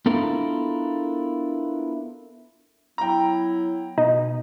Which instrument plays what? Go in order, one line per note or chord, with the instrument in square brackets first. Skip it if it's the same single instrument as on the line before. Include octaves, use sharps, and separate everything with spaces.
[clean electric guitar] B3 D4 E4 F4 A4 A#4
[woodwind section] F#3 B3 E4 [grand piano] G5 A#5
[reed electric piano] B2 [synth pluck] D#4